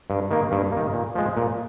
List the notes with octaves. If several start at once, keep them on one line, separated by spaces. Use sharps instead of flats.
G2
D#3 A#3
G2
D#3 A#3
A#2
F3 G#3
A#2